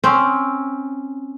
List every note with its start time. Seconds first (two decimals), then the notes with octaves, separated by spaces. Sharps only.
0.04 C4 C#4